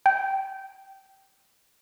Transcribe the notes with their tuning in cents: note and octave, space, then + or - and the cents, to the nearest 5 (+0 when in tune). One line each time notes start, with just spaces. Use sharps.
G5 -15